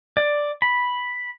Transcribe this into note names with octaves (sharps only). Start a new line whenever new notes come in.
D5
B5